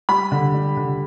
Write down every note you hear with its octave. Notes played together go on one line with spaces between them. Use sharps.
G3 B5
D3
G3
D3